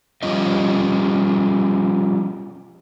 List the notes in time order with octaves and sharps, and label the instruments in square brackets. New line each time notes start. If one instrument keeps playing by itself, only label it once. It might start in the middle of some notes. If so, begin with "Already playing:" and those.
[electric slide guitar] F3 G3 C#4 F4 G4 D#5